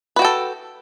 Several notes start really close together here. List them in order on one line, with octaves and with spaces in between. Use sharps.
B4 F#4 G5 A4